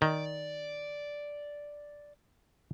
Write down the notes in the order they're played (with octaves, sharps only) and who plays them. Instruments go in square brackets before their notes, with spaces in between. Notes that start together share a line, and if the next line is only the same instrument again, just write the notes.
[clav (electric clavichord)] D#3 [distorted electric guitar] D5